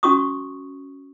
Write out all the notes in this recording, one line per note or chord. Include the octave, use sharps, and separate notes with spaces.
C#4 F#4 C#6 D#6